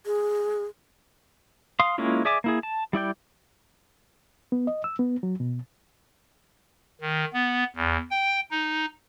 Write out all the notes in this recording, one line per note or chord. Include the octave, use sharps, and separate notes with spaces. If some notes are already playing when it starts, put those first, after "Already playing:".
G#4
F5 C6 D#6
G#3 A#3 C#4 E4 F4
G#4 D5 E5 G#5 D6
A#3 E4 G#4
A5
G3 E4 D5 G5
B3
D#5
E6
B3
F#3
B2
D#3
B3
E2
G5
D#4